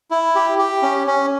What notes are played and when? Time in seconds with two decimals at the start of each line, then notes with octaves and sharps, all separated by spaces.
0.11 E4
0.35 G4
0.58 G4
0.82 C#4
1.07 C#4